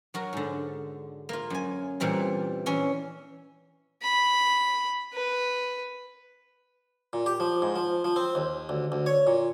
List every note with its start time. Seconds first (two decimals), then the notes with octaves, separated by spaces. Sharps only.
0.14 F#3 F#4 A#4
0.33 G#2 D3
1.29 A#3 F4
1.50 F#2 G#5
2.00 A#2 E3 G3 C4
2.66 E3 C#4
4.03 B5
5.14 B4
7.13 A#2
7.26 G4
7.40 F3
7.62 G#2
7.76 F3
8.05 F3
8.16 C4
8.35 D#2
8.69 D2
8.92 D2
9.06 C#5
9.27 A#2